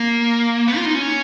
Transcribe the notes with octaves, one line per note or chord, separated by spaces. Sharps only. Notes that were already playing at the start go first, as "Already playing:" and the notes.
Already playing: A#3
B3
F4
D#4
C#4